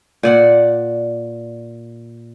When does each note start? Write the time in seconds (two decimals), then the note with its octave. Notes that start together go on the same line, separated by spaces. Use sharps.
0.23 A#2 D5 F#5